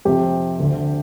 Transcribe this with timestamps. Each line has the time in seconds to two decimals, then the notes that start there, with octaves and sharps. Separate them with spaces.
0.05 F2 C3 G4
0.59 D2 D3